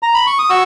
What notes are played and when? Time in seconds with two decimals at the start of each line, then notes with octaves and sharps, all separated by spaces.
0.03 A#5
0.14 B5
0.27 C#6
0.39 D#6
0.50 F#4 C#6 E6